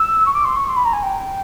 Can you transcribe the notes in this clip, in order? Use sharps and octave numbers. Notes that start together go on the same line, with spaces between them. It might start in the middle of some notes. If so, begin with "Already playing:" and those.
Already playing: E6
C#6
D6
C6
C#6
C6
B5
A#5
G#5
G5